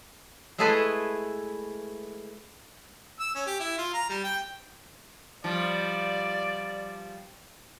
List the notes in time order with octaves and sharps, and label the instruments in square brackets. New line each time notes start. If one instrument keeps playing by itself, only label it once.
[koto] G#3 A3 E4 G#4 A4 B4
[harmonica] E6
C#4
G4
E4
F4
A#5
G3
G5
[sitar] F3 G3 [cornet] D5